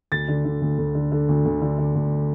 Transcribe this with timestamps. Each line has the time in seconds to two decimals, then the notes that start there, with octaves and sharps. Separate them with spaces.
0.12 D2 A6
0.28 D3
0.45 D3
0.62 D2
0.78 D2
0.95 D3
1.12 D3
1.29 D2
1.45 D2
1.61 D3
1.79 D3
1.95 D2